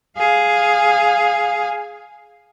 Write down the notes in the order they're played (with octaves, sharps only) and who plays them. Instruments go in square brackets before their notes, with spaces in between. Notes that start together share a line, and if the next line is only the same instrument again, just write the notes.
[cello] G#4 F5